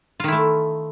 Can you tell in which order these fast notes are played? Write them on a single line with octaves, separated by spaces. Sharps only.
F4 D#3 E4 A3